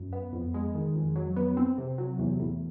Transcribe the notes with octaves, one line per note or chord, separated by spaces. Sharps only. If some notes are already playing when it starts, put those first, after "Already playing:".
Already playing: F#2
B3
F2
G#3
D#3
F2
F#3
B3
C4
C3
F#3
E2
A2